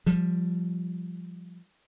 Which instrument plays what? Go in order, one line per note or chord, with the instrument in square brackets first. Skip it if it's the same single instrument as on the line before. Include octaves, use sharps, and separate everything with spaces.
[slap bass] F3 G3